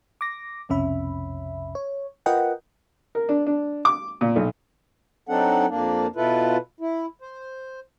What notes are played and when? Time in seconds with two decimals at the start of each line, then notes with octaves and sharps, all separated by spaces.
0.21 D6 A#6
0.69 B1 F2 C3 C#4 E5 B5
1.75 C#5
2.26 F4 A#4 B4 D#5 F#5 G5
3.15 A#4
3.29 D4
3.47 D4
3.85 D6
4.21 A#2
4.36 B1
5.29 F#3 C4 D4 D#4 A4 F#5
5.69 F2 A#3 D4
6.16 B2 E4 F4 A4 B4
6.80 E4
7.21 C5